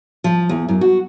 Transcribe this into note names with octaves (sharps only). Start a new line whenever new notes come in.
F3
E2
F#2
F#4